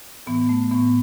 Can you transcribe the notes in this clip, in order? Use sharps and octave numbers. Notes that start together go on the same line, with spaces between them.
A2 E3 B3
A3
A2 E3 B3